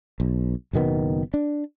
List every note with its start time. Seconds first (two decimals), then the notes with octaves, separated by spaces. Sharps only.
0.20 B1
0.73 F#1 B2 D#3 B3
1.34 D4